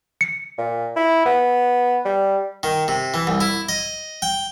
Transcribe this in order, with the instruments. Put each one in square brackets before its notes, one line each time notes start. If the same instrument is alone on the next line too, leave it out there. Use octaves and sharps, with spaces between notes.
[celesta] C#7
[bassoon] A#2
E4
B3
G3
[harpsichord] D#3
C3
E3
C2
E4
D#5
G5